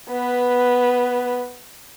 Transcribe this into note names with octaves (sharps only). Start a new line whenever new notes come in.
B3 B4